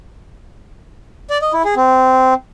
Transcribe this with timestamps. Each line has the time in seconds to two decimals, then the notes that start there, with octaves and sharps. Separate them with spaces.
1.30 D5
1.42 D#5
1.53 E4
1.65 G#4
1.76 C4